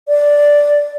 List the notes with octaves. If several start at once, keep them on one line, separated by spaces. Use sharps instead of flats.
D5